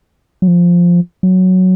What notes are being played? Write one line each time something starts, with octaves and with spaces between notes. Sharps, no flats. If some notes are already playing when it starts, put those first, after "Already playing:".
F#3
F3
F#3